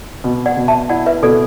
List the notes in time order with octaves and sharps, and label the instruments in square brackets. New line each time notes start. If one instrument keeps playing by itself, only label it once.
[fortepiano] B2
[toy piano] D5 F#5
[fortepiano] B2
[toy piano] E5 A5
[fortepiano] E4 [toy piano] D5 F#5
[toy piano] B4 E5
[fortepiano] B2 [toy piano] A4 D5